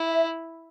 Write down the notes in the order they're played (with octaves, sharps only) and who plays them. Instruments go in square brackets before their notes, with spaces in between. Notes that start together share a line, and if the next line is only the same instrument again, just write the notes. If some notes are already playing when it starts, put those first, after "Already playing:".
Already playing: [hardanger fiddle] E4
[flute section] E5